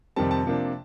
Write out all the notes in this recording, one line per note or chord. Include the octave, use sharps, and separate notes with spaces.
F2 C3 D#3 G3 C4 A5
A5
C3 F3 A#3 D4